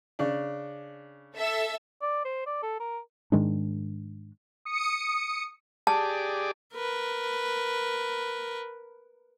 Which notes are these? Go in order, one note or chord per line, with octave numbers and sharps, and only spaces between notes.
C#3 D4
A4 E5 E6
D5
C5
D5
A4
A#4
G#2 D#3 G#3 D4
D#6 C#7
G4 G#4 D5 A5
A#4 B4